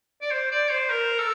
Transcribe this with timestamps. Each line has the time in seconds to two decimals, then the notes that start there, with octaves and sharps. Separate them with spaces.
0.21 D5
0.31 C5
0.51 D5
0.70 C5
0.90 A#4
1.18 A4